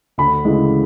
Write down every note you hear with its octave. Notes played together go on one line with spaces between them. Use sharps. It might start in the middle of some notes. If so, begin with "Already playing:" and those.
D2 B5
C#3 E3 G#3